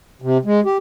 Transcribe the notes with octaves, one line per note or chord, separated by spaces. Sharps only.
C3
G#3
G4